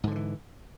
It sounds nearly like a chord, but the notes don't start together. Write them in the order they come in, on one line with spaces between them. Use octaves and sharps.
G#2 D3 F3 E3